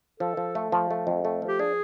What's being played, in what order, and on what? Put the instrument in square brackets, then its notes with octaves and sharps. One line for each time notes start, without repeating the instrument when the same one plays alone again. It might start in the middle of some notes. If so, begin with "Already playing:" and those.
[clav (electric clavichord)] F3 [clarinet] A4
[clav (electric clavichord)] F3
A3
F3
A3
F2
A3
F3
[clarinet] G4
[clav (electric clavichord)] D4 [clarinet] G#4